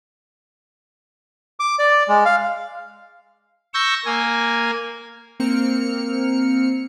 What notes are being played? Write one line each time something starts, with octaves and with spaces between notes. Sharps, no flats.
D6
D5
G#3
F5
C#6 E6 G6 A#6
A#3 G#5
A#3 C4 F6 C#7